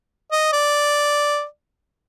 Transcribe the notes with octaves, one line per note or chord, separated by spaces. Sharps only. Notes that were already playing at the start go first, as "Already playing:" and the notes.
D#5
D5